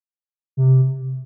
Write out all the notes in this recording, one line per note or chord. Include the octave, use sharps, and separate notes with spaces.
C3